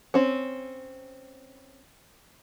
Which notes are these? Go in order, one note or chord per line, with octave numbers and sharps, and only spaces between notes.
C4 C#4